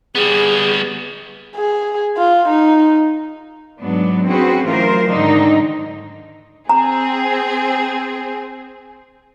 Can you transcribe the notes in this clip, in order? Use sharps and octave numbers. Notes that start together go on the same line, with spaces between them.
G3 B3 G#4
G#4
F4
D#4
G#2 F#3 B3 D4
C4 C#4 F#4 G#4 B4 C5
A2 E3 F#3 F4 A#4 C5
G#2 D3 D#3 D4 D#4
C4 G#4 A#5